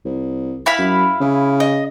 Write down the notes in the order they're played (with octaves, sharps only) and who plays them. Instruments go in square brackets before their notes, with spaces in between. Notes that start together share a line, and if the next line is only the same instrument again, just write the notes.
[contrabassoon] C2
[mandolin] E4 F5 B5
[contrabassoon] F#2
C#3
[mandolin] D#5